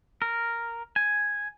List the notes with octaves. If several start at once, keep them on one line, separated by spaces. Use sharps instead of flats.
A#4
G#5